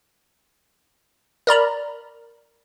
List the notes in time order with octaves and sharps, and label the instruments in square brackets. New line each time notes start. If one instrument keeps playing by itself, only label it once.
[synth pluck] A#4 D5 A#5 B5